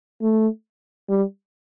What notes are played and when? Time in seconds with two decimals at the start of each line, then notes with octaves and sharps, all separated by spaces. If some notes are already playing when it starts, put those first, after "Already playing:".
0.22 A3
1.10 G3